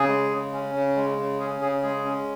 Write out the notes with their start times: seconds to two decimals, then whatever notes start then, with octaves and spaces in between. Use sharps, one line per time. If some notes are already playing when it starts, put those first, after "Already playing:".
Already playing: C#3 G#4
0.09 G#3
0.31 C#3
0.53 C#4
0.74 C#3
0.96 G#3
1.18 C#3
1.40 C#4 G#4
1.61 C#3 G#4
1.83 G#3 G#4
2.05 C#4